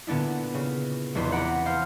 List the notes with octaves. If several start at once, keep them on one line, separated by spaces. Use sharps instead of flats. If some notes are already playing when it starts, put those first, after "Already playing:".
A#2 D3 B3 D4 E4
C#3
F1 E2 E4 C6
F#5 A#5 B5 D6
C5 F5 C6